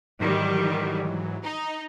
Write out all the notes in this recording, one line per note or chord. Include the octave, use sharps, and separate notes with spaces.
G#2 D#3 E3 F#3 G3
D#4